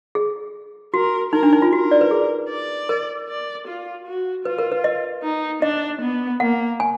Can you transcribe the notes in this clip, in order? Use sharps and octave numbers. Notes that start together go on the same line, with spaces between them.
G#4
F#4 A#4
D#4 A#4
D4
D#4
F4
F#4 A#4
D5
B4
G#4
D5
A#4
D5
F4
F#4
F4 B4
A#4
B4
D#5
D#4
D4 D#5
B3
A#3 F#5
G#5